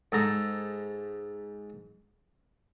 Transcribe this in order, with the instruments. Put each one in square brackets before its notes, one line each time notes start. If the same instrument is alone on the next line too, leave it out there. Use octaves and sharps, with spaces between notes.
[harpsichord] G#2 A4 A#5